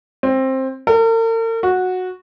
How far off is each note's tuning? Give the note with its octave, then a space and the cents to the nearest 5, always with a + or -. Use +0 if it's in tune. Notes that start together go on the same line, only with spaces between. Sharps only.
C4 +15
A#4 -45
F#4 -10